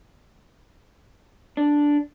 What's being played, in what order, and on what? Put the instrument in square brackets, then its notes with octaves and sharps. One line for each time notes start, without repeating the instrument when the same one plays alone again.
[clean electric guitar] D4